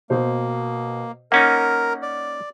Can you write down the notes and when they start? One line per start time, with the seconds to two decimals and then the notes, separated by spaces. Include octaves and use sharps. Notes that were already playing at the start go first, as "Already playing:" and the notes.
0.10 B2 A#3 C5
1.32 A#3 C#4 D#4 A#4 F#5
2.02 D5